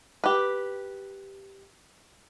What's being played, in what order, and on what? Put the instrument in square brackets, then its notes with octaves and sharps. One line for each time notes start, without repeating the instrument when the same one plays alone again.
[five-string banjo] G4 B4